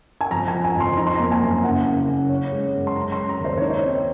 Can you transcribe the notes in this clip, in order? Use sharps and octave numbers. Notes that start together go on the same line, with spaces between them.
G#5
F2 A#5
G#5
F3
G#5
F2 C6
D#4 A#5
C6
A#3 A#5
G#5
F#2
F#1 F#5
C#3
F#1
C#4
G#3
F#2
C6
C#4 A#5
G#3 C6
A#5
D#2
C5
D#4 C#5
C5
C4